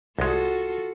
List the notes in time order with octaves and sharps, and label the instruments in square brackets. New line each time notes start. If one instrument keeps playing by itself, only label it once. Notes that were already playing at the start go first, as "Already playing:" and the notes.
[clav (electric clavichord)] C2 G#3 [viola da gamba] F4 F#4 A4